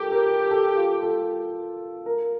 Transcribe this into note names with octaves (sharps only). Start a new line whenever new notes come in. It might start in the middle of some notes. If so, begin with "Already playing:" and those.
Already playing: F4 G4 A4 A#4
A#4
A4
F4
A4
A#4